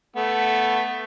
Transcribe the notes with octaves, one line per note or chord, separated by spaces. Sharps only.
A3 B3